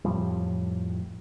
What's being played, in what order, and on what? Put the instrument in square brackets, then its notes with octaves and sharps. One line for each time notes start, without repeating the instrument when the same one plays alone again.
[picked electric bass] F2 A2 F3 G3